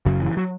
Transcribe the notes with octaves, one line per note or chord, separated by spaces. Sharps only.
F#1 F#2 C#3 F#3
E3
F#3